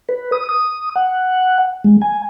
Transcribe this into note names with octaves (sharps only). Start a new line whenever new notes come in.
B4
D#6
D#6
F#5
G#3
G#5